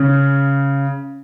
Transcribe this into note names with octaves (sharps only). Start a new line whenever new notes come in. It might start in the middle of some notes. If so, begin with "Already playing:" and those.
Already playing: C#3